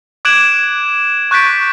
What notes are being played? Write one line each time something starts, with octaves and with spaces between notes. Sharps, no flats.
D6 F#6 G#6 D7 E7 F#7
C#6 F#6 G6 A6 B6 D7